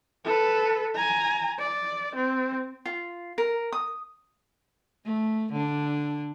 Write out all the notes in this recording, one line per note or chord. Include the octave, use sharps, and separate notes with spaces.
A4 B4
G#5 A#5
D5
C4
F4
A#4
D#6
A3
D3 D4